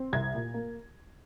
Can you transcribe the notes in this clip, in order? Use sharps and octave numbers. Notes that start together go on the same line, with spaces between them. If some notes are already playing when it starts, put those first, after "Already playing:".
Already playing: C4
C2 G#6
A#2
A#3